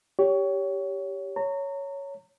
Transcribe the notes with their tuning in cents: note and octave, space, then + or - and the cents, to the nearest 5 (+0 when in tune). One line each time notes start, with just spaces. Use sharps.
G4 +0 C#5 +20
C#5 +5 A#5 -30